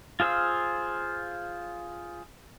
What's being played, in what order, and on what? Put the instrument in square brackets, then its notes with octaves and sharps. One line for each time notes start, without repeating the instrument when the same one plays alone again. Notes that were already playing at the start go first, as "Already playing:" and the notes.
[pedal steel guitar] F4 G#4 C5 F5 E6